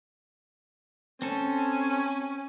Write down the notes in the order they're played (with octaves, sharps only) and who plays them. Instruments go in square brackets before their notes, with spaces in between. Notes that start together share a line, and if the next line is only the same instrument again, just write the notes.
[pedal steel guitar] C4 A4 [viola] C#4